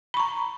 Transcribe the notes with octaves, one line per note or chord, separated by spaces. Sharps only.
A#5 B5 C#6